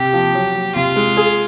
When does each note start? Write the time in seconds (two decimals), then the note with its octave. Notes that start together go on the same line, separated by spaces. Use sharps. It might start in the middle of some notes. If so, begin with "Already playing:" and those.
Already playing: C3 G4
0.13 F3
0.35 F#3
0.55 F#3
0.76 C3 F4
0.96 G#3
1.17 G#4